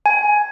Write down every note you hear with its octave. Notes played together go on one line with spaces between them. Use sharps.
G#5